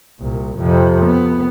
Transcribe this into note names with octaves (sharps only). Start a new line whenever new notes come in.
C2 A#2
F2 C3
B3